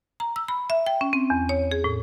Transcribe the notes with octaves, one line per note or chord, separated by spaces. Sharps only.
A#5
E6
B5
E5
G5
C#4
C4
E2
C#5
G#4
A2